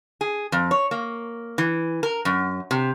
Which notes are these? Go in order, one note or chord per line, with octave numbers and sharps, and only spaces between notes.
G#4
F2
C#5
A#3
E3
A#4
F#2
C3